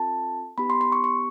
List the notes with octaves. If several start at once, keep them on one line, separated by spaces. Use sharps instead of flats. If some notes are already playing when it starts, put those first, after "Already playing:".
Already playing: C4 F4 A4 A5
B3 D#4 G4 B5
C6
C6
C#6
C#6